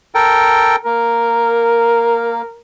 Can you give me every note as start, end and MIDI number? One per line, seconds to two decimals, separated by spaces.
0.15 0.76 69
0.15 0.76 70
0.15 0.76 79
0.85 2.42 58
0.85 2.60 70